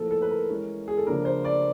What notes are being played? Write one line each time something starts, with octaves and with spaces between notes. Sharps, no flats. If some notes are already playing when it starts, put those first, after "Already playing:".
Already playing: A2 F3 A#3 A4
A4
B4
A#4
E3 G#3 C#4
G#4
A4
C#3 F3 A#3 D4 A#4
C5
D5